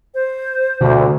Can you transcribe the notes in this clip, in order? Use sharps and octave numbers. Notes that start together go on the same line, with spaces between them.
C5
D2 B2 D3